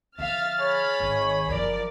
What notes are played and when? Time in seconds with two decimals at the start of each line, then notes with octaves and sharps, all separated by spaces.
0.19 D3 F3 E5 F5 F6 A6
0.59 G#4 C#5 B5
1.00 G#1 D#3
1.49 F#1 F#2 F3 A#4 D5